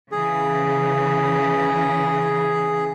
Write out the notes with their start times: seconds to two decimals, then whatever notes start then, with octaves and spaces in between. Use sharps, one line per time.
0.12 C#3 E3 G#4